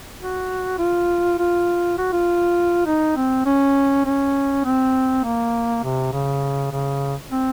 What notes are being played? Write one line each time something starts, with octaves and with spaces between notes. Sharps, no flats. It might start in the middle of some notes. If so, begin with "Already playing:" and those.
F#4
F4
F4
F#4
F4
D#4
C4
C#4
C#4
C4
A#3
C3
C#3
C#3
C4